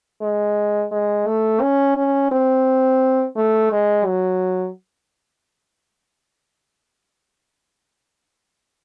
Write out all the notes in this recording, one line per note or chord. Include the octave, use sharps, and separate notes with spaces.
G#3
G#3
A3
C#4
C#4
C4
A3
G#3
F#3